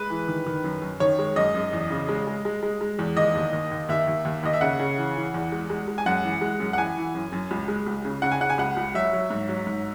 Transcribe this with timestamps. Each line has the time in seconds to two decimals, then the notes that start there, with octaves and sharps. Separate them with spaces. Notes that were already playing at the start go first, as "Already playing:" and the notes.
Already playing: G#3 B4
0.10 E3
0.28 D#3
0.47 D#3
0.64 F#2
0.82 F#2
1.00 D#3 C#5
1.19 G#3
1.36 F#2 D#5
1.55 F#2
1.73 E2
1.90 C#3
2.09 G#3
2.27 G#3
2.45 G#3
2.63 G#3
2.81 G#3
2.99 E2
3.17 D#2 D#5
3.35 D#2
3.53 D#2
3.71 D#2
3.89 D#2 E5
4.08 D#2
4.25 D#2
4.43 D#2 D#5
4.53 E5
4.61 C#3 F#5
4.79 C#3
4.97 E3
5.16 E3
5.34 E2
5.52 G#3
5.70 G#3
5.88 G#3
5.98 G#5
6.06 F#2 F#5
6.23 E3
6.41 G#3
6.60 F#2
6.73 F#5
6.78 E3 G#5
6.97 E3
7.15 F#2
7.32 F#2
7.51 C#2
7.68 G#3
7.86 C#2
8.05 C#3
8.22 C#3 F#5
8.31 G#5
8.40 C#3 F#5
8.50 G#5
8.58 C#2 F#5
8.77 C#2
8.94 F#3 E5
9.13 F#3
9.30 G#2
9.49 F#3
9.67 G#2